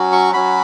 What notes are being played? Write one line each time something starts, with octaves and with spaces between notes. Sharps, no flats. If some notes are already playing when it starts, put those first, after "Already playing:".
Already playing: F#3 C#4 F#4
C#6
F#3 C#4 F#4 B5